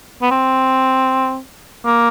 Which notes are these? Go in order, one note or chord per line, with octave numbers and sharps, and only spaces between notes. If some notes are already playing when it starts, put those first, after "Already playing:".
B3
C4
A#3